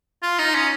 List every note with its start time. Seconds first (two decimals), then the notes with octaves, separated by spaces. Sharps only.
0.22 F4
0.39 D#4
0.54 C#4